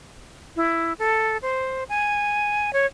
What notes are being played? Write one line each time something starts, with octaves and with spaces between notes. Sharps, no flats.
E4
A4
C5
G#5
C#5